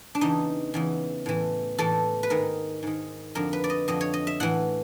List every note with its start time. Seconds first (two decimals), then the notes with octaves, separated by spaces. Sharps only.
0.15 D4
0.21 E2 C#3 E3 D#4
0.74 E2 C#3 E3
1.26 A2 E3
1.78 A2 E3 A4
2.23 B4
2.30 G#2 D#3 A#4
2.83 G#2 D#3
3.35 F2 D3 A#4
3.53 B4
3.64 D5
3.70 D#5
3.88 F2 D3 D#5
4.01 C#5
4.14 D#5
4.27 E5
4.40 A2 E3 F#5